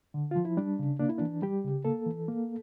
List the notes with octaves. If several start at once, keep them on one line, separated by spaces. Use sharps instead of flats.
D3
F3 F4
E4
G3 D4
C#3
A#3 D4
E4
E3 D4
G3 G4
C#3
A#3 A4
E3
A#3